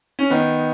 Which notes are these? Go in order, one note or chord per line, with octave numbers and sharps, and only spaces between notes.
C#4
D#3 B3 D#4